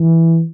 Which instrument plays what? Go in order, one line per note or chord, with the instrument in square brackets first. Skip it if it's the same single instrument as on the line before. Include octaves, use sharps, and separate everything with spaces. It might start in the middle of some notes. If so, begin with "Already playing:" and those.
Already playing: [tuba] E3